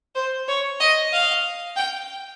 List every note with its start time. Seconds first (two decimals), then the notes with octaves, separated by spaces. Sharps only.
0.15 C5
0.48 C#5
0.80 D#5
1.12 F5
1.76 G5